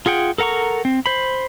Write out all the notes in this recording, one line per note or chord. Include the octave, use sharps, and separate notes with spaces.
F4 G#4 F#5 G5
A4 A#4 F#5 A#5 C#6
C4
C5 B5